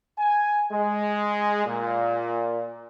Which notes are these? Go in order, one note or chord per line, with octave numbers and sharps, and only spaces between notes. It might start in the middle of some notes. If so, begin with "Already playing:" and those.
G#5
G#3
A#2